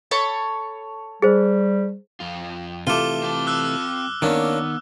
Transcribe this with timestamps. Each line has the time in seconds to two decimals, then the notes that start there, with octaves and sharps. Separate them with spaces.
0.11 A4 C#5 B5
1.22 G3 G#4 C5
2.20 F2 F4
2.87 C3 E3 A3 F4 A4 D6 F6 G7
3.23 C4 A5
3.47 D6 E6 F#6
4.22 D#3 A#3 B3 C#4 D4